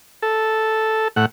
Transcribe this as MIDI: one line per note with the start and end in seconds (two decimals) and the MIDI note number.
0.22 1.08 69
1.16 1.25 45
1.16 1.25 78